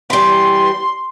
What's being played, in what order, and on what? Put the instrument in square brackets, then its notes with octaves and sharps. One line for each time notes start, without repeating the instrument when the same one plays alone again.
[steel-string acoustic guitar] E3 G3 [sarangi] C6